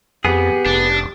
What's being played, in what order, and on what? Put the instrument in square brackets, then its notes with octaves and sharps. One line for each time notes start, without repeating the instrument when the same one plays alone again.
[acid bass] F2 [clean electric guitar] B3 G#4 [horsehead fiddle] G4
[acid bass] F1 [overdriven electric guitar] D4